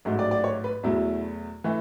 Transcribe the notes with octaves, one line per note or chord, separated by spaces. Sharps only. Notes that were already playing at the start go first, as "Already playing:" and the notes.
A1 G#2 F#3 A3
D5
D5
C#5
B4
E2 B2 F#3 A3 E4
E3 A3